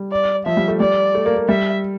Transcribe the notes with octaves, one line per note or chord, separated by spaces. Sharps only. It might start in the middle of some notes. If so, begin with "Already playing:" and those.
Already playing: G3
D5
F3 E5
G3
A3
G3 D5
A3
A#3
A#3
G3 E5